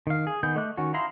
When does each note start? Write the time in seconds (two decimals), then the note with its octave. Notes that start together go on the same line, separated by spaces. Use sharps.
0.07 D#3 F5
0.27 G#4
0.43 D#3 B3 G6
0.56 A3 D#5 D6 F#6
0.78 D#3 C#4 F#4
0.94 D#4 E4 F5 A#5 C6